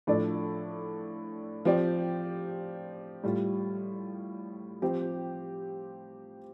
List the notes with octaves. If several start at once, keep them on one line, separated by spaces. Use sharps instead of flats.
A2 F3 D4 A4 D5
F3 C4 G4 D5
A2 G3 F4
F3 C4 G4